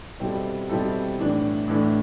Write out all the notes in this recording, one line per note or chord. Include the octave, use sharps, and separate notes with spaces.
B2 G3 C4 E4 A4
B2 G3 C4 E4 A4
A2 E3 A3 D4
A2 E3 A3 D4